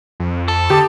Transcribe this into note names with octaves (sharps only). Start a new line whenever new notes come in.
F2
A4
D3 G4 A5 D6 D#6